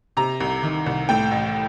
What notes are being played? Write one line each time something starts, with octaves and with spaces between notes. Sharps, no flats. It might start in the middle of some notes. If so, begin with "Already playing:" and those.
C3 A#5
C2
D#3
C2
A2 G5
A1